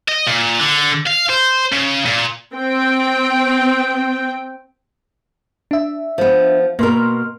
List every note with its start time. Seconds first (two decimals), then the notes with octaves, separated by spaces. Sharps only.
0.08 D#5
0.27 A#2
0.59 D3
1.06 F5
1.29 C5
1.72 C#3
2.06 A#2
2.54 C4 G5
5.71 D4 E5
6.18 F3 B3
6.79 B2 A#3 A#4 C6 F6